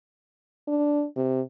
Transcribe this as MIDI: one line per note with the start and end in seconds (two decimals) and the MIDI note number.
0.68 1.05 62
1.16 1.41 48